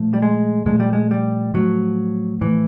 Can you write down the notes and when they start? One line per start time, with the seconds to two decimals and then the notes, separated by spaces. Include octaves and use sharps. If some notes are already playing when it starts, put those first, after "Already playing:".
Already playing: A#2 F3 A3
0.14 G3
0.22 G#3
0.66 A#2 F3 G#3 A3
0.80 G3
0.93 G#3
1.11 G3
1.54 A2 F3 F#3 A3
2.41 A2 E3 F3 A3